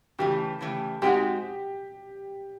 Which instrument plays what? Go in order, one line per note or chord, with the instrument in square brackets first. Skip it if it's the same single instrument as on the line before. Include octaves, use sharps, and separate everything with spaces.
[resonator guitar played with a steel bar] C#3 E3 A3 [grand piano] G4
[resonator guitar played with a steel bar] C#3 E3 A3
[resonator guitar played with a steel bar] G#3 C4 D#4 F#4 [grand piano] G4